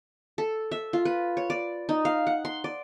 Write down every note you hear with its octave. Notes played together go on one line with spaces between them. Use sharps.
A4
E5
F4
B4
C#5
D5
D#4
F5
F#5
C6
D5